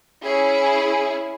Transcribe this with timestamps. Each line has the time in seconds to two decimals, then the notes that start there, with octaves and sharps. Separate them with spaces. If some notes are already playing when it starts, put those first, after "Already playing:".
0.22 C#4 E4 G#4